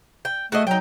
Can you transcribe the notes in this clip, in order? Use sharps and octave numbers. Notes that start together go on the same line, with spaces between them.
G5
A3 F#4 G#4 D#5
F#3 D#4 G5